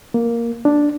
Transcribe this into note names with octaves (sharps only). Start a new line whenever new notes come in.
A#3
D4